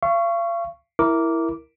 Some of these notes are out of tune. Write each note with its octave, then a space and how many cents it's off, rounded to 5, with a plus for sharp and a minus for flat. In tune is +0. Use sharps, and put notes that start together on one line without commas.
F5 -40 C#6 +0
E4 +0 A#4 +0 D6 -15